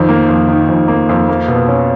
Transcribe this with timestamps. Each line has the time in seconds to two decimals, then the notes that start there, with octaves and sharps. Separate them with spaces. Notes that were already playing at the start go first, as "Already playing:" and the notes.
Already playing: F2 D#3
0.09 A#3
0.29 F2
0.48 D#3
0.68 F2
0.88 A#3
1.09 F2
1.29 A#3
1.48 B2
1.68 C#4